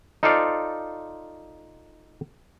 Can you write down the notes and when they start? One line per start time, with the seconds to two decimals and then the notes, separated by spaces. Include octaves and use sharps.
0.23 D#4 F4 A4 C5 D5 F5